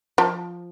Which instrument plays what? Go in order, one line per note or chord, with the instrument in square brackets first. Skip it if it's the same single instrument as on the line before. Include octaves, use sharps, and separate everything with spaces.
[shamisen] F3